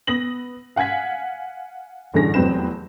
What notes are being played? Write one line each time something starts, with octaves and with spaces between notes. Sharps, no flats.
B3 D#6 A#6 F#7
F5 F#5 G#5 G#6 B6
A1 G2 D3 E3 G#4 A#6
F1 E2 F#3 C4 B4 E7